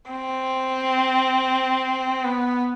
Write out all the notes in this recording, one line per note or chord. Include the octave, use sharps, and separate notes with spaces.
C4
B3